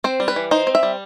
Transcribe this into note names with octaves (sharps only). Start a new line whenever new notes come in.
C4 C5
G3
B4
E3
D#4 C5
C4
E5
G3